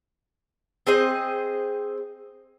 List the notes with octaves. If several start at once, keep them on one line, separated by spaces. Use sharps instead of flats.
C4 G#4 C5 D#5